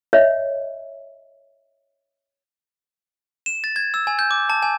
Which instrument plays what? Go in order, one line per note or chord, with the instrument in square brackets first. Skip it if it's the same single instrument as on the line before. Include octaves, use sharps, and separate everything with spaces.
[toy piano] C#5 D#5 E5
[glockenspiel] E7
A6
G#6
E6
G#5
G6
D6
A5
G#5